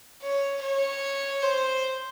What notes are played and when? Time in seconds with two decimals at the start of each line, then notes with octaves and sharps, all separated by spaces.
0.22 C#5
0.61 C#5
1.42 C5